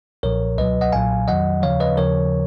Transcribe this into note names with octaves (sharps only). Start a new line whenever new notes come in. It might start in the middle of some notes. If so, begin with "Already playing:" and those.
B1 A#2 F3 A#4 C#5
C#2 B2 F#3 B4 D#5
D#5 F#5
B1 A#2 F#3 F5 G#5
F2 D#3 F#3 D#5 F#5
D#2 C#3 F3 C#5 F5
B4 D#5
D#2 C#3 F3 A#4 C#5